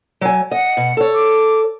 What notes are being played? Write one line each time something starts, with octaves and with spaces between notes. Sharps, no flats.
F#3 G#5
D#5 F#5
B2
A4 C#5
D6